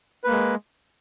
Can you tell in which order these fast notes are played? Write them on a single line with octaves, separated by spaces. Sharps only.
B4 A#3 G#3